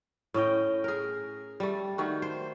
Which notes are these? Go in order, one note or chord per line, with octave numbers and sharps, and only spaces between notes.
A2 C#4 D#5 G5
G#4 A#4
G3 A3
D#3 A3 F#4
C5